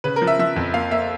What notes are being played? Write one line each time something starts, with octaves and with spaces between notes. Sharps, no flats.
C#3 B4
A#4
F3
E5
F3 E5
F2
A#3 F5
A#3 E5